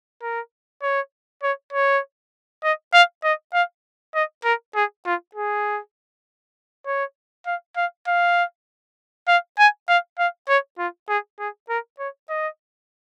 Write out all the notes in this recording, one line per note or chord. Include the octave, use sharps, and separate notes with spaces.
A#4
C#5
C#5
C#5
D#5
F5
D#5
F5
D#5
A#4
G#4
F4
G#4
C#5
F5
F5
F5
F5
G#5
F5
F5
C#5
F4
G#4
G#4
A#4
C#5
D#5